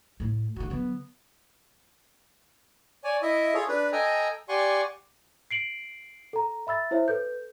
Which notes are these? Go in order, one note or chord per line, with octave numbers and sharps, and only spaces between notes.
A2 A3
D2 D3 F#4
D3 F#3 B3
C#5 D5 G#5
E4 D#5 E5
F4 G#4 A4 C#5
D4 B4
A4 D#5 G5 G#5 A#5
G4 D5 F#5 G#5 C6 C#6
C7 D7 F#7
A4 A#5
E5 B5 E6 A6
E4 C5 C#5 E5
A4 B4 G6